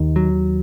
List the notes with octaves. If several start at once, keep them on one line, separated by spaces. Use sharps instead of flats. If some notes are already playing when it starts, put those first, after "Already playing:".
Already playing: D#2 D#3
F#3